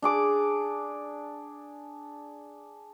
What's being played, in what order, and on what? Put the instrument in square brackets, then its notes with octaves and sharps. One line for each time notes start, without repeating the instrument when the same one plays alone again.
[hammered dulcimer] D4 G#4 D6